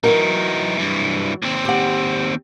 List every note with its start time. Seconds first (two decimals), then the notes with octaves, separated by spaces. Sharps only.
0.04 E3 F#3 D#4 F#4 A#4
0.78 G2 E3
1.42 D#2 C4
1.65 G4 F#5